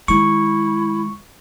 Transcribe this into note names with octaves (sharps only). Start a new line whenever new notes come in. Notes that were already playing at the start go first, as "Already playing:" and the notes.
D#3 G#3 E4 C#6